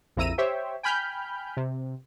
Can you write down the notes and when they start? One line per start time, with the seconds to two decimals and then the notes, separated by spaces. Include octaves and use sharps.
0.17 A#1 F2 E4 A#5 E6 D#7
0.38 G4 C5 C#5 E5 G5
0.83 G5 G#5 B5 F6 G6
1.57 C3